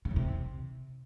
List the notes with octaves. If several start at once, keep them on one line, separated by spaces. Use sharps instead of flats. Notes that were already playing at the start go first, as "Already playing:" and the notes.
C#3
E2
C3